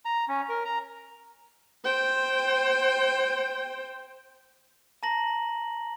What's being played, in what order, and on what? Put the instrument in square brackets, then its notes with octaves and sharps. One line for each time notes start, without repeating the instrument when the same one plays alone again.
[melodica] A#5
C#4
A#4
A#5
[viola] C5 G5
[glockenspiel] A5 A#5 A#6 F#7